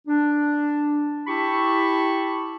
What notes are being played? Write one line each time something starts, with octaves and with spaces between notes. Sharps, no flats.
D4
E4 G4 A5 B5 C#6